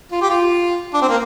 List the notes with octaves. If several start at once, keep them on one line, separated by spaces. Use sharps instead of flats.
F4
G4
F4
D4
C4
A#3